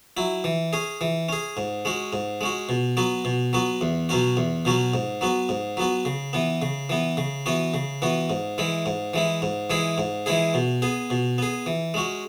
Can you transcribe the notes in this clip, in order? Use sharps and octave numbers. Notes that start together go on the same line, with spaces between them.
F#3 E4
E3
C#4 G#4
E3
C#4 G#4
G#2
G#3 C#4 F#4
G#2
G#3 C#4 F#4
B2
F#3 B3 F#4
B2
F#3 B3 F#4
E2
B2 F#3 C#4 F#4
E2
B2 F#3 C#4 F#4
G#2
F#3 B3 F#4
G#2
F#3 B3 F#4
C#3
E3 B3
C#3
E3 B3
C#3
E3 B3 F#4
C#3
E3 B3 F#4
G#2
E3 G#3 E4
G#2
E3 G#3 E4
G#2
E3 G#3 E4 G#4
G#2
E3 G#3 E4 G#4
B2
B3 G#4
B2
B3 G#4
E3
G#3 C#4 F#4